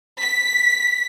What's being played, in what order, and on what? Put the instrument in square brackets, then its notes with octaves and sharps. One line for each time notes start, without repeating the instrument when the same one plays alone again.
[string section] B6